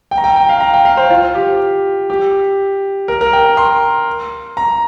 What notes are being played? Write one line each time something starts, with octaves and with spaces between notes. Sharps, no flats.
G5
A#5
G5
G5
F5
A#5
G5
F5
C5
F4
G4
G4
A#4
A#4
G5
A#5
C6
A#5